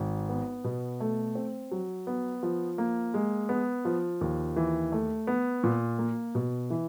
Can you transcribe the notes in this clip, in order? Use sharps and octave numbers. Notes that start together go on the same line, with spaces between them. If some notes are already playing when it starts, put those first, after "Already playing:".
Already playing: G#1
B3
B2
A3
C4
F#3
B3
F3
A#3
G#3
B3
F3
D#2
E3
A3
B3
A#2
A#3
B2
E3